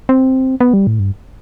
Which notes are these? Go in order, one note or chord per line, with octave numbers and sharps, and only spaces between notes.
C4
B3
G3
A2
G2